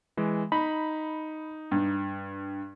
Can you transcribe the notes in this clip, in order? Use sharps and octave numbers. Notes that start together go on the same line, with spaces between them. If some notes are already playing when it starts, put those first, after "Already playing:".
E3 G#3
D#4 B5
G2